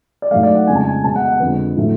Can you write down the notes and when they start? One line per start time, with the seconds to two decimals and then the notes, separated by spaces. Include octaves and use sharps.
0.22 D5
0.31 A3 F5
0.34 G#2 F#3
0.43 D5
0.55 F#5
0.67 F2 C#3 G#3 G#5
0.75 A5
0.84 G#5
1.04 B2 G#3 A5
1.16 F#5
1.28 F#5
1.40 F2 D3 G#3 B4
1.76 A2 F#3 A3